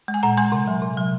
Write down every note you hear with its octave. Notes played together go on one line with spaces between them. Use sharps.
G#3
G#5
A#2 F#5 A#5
G#3 G#5 C6
C3
F#3
C3
F#3